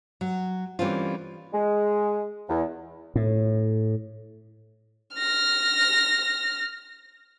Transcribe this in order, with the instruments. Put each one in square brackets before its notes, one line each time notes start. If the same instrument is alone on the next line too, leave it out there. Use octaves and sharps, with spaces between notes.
[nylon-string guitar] F#3
E3 G3 A#3 C4 C#4 F4
[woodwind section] G#3
E2
[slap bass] A2
[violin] F6 A#6